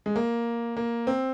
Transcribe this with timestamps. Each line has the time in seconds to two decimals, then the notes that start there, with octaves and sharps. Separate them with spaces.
0.06 G#3
0.16 A#3
0.77 A#3
1.07 C4